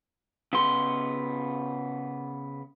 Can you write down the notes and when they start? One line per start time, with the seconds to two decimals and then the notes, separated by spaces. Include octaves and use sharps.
0.53 C#3 B3 C6